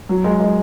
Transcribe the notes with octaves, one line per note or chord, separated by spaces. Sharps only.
F#3
G#3
G#3